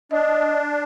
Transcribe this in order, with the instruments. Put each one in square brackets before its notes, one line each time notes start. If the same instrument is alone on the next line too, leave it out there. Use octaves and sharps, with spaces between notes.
[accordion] D4 [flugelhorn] D#5